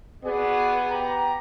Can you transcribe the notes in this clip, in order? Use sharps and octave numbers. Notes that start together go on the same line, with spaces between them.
B3 F#4 G#4 D5
G4 A#5